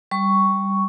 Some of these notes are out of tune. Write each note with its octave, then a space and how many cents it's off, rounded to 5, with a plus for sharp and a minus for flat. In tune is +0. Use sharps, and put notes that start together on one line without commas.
G3 +0 C#6 +5